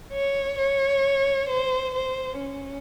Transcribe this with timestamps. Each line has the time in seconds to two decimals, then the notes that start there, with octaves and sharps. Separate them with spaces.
0.13 C#5
0.58 C#5
1.49 C5
1.95 C5
2.40 C#4